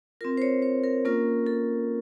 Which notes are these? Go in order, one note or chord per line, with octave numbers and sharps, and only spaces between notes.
C4 F4 A#4
C5
C#5
C5
A#4
A#3 C#4 F4 A#4
A4